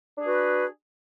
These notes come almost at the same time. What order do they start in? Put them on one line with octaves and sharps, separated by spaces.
D4 G#4 F#4 B4